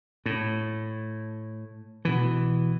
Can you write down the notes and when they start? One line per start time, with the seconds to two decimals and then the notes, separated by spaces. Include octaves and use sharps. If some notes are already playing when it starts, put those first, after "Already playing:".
0.26 A2
2.05 B2 E3